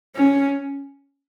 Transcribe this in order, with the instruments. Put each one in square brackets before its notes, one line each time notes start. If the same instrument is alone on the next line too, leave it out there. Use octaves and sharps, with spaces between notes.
[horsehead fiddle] C#4